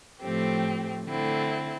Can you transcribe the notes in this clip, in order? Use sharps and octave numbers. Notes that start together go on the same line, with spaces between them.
A2 F3 A3 C4 G4
D3 A3 C4 E4